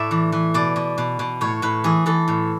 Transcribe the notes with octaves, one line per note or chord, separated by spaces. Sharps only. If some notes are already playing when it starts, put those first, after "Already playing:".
Already playing: A2 D5 E5
E3
E3
B2 D5
B2
B2
B2
A2 C#5
A2 B4
E3 G#4
E3 A4
A2